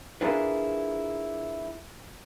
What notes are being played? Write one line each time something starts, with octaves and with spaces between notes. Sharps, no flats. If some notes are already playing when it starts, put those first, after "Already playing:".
D4 E4 F4 G#4 A#4 B4